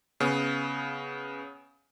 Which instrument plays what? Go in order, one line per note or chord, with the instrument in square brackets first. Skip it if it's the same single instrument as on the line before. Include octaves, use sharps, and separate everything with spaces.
[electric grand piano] C#3 B3